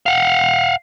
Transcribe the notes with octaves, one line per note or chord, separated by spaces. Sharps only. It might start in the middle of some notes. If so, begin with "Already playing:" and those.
F5 F#5